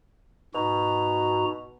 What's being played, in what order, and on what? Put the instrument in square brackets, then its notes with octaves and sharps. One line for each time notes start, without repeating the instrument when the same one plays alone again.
[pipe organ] G#2 F#4 A#5 [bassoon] B2